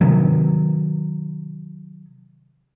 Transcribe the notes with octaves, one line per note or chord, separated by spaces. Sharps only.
C3 D#3 F#3